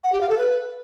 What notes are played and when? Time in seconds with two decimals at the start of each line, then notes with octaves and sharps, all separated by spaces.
0.04 F#5
0.12 G4
0.21 F5
0.29 A4
0.38 B4